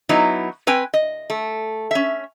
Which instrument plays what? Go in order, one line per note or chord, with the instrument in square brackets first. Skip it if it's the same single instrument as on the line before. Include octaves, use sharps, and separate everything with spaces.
[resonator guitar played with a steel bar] F#3 B3 D#4 E4
C4 B4 G5 G#5
D#5
A3
C#4 E5